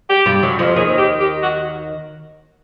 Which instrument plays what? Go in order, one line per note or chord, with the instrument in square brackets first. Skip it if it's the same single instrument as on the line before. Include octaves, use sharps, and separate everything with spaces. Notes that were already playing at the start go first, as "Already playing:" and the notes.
[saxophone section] G4
[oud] G2 G3
F#2 F#3
F2 F3
[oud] D#2 D#3 [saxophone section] G#4
[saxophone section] G4
G4
F#4